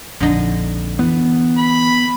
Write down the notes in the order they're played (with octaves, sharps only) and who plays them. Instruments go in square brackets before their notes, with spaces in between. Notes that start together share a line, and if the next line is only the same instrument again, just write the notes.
[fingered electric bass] A#1 F2 [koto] D3 D#4
[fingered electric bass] E3 [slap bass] B3
[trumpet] B5